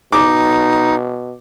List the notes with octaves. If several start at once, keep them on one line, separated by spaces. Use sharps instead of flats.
B2 D#4 D6